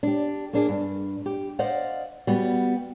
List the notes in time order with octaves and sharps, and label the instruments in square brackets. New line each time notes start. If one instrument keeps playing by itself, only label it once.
[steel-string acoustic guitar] D4 G4
A#3 D4 G#4
G2
G4
C5 D5 D#5 F5 F#5
G3 B3 F#4